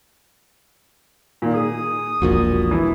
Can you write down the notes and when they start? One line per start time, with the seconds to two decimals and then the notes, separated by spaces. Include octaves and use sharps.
1.42 A#2 D#3
1.54 G#4 D#6
2.22 E1 A#1 A#2 F#4
2.71 E3